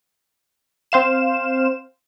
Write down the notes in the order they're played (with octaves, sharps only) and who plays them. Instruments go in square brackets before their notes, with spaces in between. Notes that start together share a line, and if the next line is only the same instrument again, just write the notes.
[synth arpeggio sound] C4 C5 F5 E7